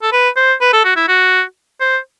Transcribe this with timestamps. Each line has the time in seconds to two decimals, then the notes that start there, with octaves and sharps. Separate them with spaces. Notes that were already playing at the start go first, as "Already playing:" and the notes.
0.02 A4
0.12 B4
0.36 C5
0.61 B4
0.73 A4
0.84 F#4
0.96 E4
1.08 F#4
1.80 C5